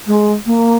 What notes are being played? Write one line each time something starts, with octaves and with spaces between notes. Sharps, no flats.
G#3
A#3